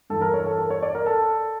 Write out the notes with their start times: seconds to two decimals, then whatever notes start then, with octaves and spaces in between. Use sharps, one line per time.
0.10 G2 E3 A4
0.21 A#4
0.34 C#5
0.46 A4
0.58 A#4
0.70 C#5
0.82 D5
0.95 A#4
1.06 A4